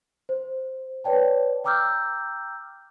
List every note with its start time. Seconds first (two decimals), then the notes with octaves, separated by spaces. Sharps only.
0.29 C5
1.04 B4 C#5 D5 G5 A5
1.64 G5 A#5 D6 E6 F6 G6